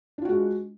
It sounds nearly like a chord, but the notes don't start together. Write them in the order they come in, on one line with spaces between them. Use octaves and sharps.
D4 F4 F#4 G#3